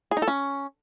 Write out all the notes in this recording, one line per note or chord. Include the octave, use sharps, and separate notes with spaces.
G#4
D#4
A4
C#4